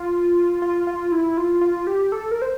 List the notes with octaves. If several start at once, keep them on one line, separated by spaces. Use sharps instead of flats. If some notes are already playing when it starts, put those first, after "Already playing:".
Already playing: F4
F4
F4
E4
F4
F4
G4
A4
A#4
C5